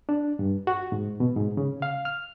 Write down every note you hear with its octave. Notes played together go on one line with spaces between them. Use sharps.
D4
G2
F#4
G#2
B2
G#2
C#3
F5
F6